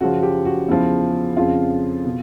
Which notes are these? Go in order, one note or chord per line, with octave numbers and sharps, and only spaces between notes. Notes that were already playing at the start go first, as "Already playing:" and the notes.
F#2 C#3 F3 F#4
G4
F#4
E2 C#3 F3 E4
F2 C#3 F3 F4
B2